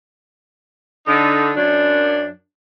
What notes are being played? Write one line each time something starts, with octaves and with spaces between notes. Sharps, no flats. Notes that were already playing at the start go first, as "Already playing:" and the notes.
D3 D#4
F#2 D4